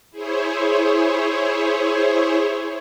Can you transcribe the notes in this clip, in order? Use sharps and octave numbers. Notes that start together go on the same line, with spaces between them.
E4 G#4 C5 C#5